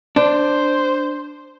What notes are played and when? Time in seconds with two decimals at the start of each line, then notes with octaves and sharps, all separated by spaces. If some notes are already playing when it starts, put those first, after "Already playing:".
0.16 D4 C5